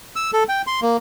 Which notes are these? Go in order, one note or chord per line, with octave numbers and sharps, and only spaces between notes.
E6
A4
G5
C6
A#3